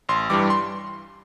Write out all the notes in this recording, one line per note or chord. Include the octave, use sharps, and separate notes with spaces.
A1 C6
G2 E3 G3 D6
C6